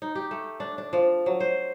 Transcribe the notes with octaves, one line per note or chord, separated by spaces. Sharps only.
D#4
G4
A3
D4
D4
F3
F#3
C5